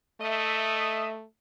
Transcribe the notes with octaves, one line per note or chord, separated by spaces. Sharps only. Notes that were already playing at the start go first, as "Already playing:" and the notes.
A3 D#5 E5